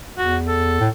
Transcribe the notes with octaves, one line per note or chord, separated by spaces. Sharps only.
E2 F#4
A4
A2